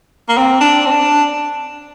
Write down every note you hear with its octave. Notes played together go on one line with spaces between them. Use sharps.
A#3
C4
D4
C4
D4